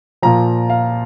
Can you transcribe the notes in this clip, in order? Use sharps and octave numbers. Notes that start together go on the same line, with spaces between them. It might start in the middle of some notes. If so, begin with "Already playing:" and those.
A#2 F3 A#5
F5